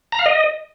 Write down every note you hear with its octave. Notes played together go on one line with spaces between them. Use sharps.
A#5
F5
D#5